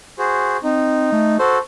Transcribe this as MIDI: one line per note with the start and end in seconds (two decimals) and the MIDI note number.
0.19 0.57 66
0.19 0.57 68
0.19 0.57 72
0.63 1.08 60
0.63 1.36 63
1.12 1.39 57
1.39 1.58 66
1.39 1.58 69
1.39 1.59 72